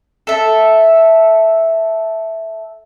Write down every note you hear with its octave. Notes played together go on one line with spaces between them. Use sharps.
A4 E5